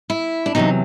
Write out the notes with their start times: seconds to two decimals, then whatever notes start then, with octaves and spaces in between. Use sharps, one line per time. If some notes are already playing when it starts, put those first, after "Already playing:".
0.10 E4
0.46 D4
0.55 E2 C3 D#3 F#3 D#4